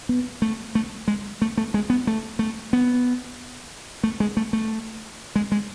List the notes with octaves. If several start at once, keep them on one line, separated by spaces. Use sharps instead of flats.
B3
A3
A3
G#3
A3
A3
G#3
B3
A3
A3
B3
A3
G#3
A3
A3
G#3
G#3